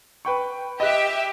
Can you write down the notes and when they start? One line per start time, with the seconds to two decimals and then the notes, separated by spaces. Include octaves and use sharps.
0.25 B4 G5 C#6
0.80 G4 D#5 E5 F#6